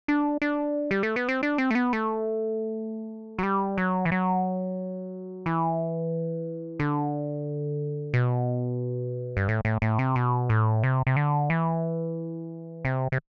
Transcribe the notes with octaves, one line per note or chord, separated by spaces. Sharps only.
D4
D4
G3
A3
B3
C4
D4
C4
A3
B3
A3
F#3
G3
F#3
E3
F#3
E3
D3
B2
G2
A2
A2
A2
C3
B2
A2
C3
C3
D3
E3
C3
C3